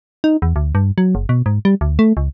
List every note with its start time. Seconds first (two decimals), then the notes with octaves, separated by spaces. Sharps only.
0.24 D#4
0.42 E2
0.56 D2
0.75 G2
0.98 F#3
1.15 F#1
1.29 B2
1.46 G#2
1.65 G3
1.81 D2
1.99 A3
2.17 C#2